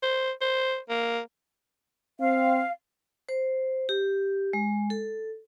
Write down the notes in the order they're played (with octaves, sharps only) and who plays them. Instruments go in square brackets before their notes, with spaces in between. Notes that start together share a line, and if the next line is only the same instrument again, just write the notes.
[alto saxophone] C5
C5
A#3
[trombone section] C4 [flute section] F5
[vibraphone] C5
G4
G#3
A4